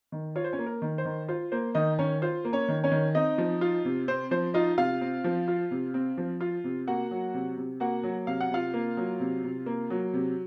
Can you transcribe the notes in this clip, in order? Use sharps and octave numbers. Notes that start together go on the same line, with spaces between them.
D#3
F4 C#5
C5
C#4 C#5
A#3
A#4
D#3
C5
D#3
F4 C5
A#3 C5
D#3 D#4 D#5
D#3 C#4 C#5
F4 C5
A#3
C#4 C#5
D#3
C#4 C#5
D#3
C4 D#4 D#5
F3
F4
C3
C4 C5
F3 C5
D#4 F4 D#5
C3 F4 F5
C4
F3
F4
C3
C4
F3
F4
C3
A#3 F#4 F#5
F#3
C3
C3
A#3 F#4 F#5
F#3
C3 F5
F#5
C3 F4 F5
A#3
F#3
C3
C3
A#3
F#3
C3